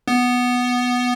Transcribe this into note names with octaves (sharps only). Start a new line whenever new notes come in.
B3